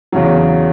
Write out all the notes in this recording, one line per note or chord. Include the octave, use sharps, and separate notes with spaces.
E2 C#3 F#3